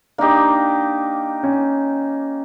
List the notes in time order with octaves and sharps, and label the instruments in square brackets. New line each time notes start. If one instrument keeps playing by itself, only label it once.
[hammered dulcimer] A#3 D#4 G4 [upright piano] D4
[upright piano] C#4